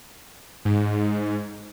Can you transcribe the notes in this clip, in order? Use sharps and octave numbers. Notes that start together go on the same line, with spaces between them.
G#2